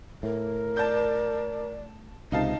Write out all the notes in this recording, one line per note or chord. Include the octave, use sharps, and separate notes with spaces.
A2 A#4
D5 A5 G6
C#2 C3 D#4 D#5 F5 A5